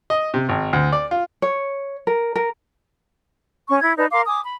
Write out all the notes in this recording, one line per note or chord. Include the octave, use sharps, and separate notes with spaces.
D#5
C3
G#1
D2
D5
F4
C#5
A#4
A#4
C#4 C#6
E4 G#6
D#4 B4 D5 A5
A#4 F5 C6 D6
G#5 D6 D#6
B5